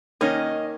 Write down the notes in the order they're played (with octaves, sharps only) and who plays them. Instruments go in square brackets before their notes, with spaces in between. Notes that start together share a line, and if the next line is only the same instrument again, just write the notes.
[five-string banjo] D#3 A#3 C#4 [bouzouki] D#5